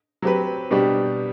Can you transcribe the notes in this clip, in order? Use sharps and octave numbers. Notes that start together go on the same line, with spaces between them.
F#3 C4 G4 B4
B2 G3 D4 G4